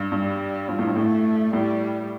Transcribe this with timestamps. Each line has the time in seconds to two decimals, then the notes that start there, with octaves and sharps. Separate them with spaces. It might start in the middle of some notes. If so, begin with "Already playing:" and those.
Already playing: G2
0.12 G2 G3
0.68 G2 F3
0.79 A2
0.87 G2
0.96 A2 A3
1.53 A2 G3